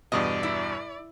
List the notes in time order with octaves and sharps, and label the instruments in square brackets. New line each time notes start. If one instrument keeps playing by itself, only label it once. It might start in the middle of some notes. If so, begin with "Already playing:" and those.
[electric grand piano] E2 G2 B2 [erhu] D5 [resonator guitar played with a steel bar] D#5
[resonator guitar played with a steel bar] E4